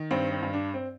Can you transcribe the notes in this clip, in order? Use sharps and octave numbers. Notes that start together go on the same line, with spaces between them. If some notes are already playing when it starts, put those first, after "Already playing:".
Already playing: D#3
G2 C4
C4
G2
D4
C4